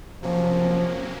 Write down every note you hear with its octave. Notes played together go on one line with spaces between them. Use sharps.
C3 F3 F#3 A#3 C#4